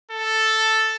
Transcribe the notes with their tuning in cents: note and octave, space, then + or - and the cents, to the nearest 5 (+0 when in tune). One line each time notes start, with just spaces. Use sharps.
A4 +0